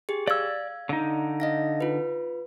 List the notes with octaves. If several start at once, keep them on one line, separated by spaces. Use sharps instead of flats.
G4 G#4
D5 F5 E6 G#6
D3 D#4
D#5 F5 A#6
F4 B4